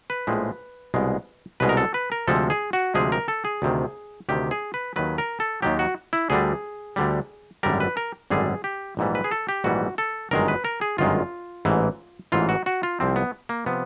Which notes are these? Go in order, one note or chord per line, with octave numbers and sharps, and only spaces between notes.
B4
A#1 A2 F3 G#3
C2 B2 G#3
C2 B2 G#3 B4
A#4
A4
B4
A#4
D2 C3 F3 G#3 A4
G#4
F#4
D2 C3 F3 G#3 G#4
A#4
A4
G#4
D2 C3 D#3
D2 C3 D#3 G4
G#4
B4
D#2 D#3 F#3 B4
A#4
A4
D#2 D#3 F#3 G4
F#4
E4
D2 D3 G3 G#4
D2 D3 G3
G#1 F#2 D3 G3 A#4
B4
A#4
G#1 F#2 D3 G3 G#4
G4
A#1 G#2 E3 G3
B4
G#4
A4
G4
A#1 G#2 E3 G3 F#4
A4
G1 F#2 D#3 G#3 A#4
B4
A#4
G#4
G1 F#2 D#3 G#3 F4
A1 G#2 E3
A1 G#2 E3 F4
F#4
F#4
F4
C2 C3 F3 C4
B3
A#3
C3 F3 B3